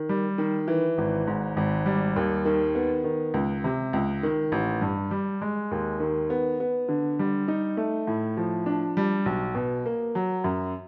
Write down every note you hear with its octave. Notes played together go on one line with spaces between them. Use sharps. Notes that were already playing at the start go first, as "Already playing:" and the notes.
Already playing: D#3
G3
D#3
E3
G#1
G#2
G#1
G3
D#2
D#3
B3
D#3
C#2
C3
C#2
D#3
A1
G2
G3
G#3
D#2
D#3
B3
B3
D3
G3
D#4
A3
A2
F3
D4
G3
B1
B2
A#3
F#3
F#2